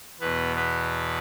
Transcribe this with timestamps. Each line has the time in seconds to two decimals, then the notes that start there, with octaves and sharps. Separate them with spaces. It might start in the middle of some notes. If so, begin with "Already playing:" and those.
0.20 E2 B2 B3 B4
0.56 B3 B4